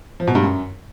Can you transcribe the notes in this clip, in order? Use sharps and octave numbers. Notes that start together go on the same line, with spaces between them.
F3
B2
G2
F#2